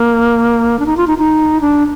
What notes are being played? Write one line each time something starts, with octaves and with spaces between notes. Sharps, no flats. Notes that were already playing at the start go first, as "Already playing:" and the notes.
Already playing: A#3
D4
D#4
F4
D#4
D#4
D4